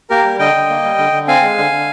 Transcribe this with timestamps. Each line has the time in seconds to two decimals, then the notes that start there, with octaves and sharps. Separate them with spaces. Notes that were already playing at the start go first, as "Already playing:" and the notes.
0.10 A#3 G4 A#4
0.25 G3
0.39 D3 D#5 G5
0.54 D3
0.70 A#3
0.84 G3
0.98 D3
1.13 D3
1.27 C4 F5 G#5
1.42 G#3
1.58 D3
1.72 D3